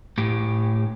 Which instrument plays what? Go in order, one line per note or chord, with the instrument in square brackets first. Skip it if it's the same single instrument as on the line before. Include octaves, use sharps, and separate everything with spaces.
[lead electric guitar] A2 G4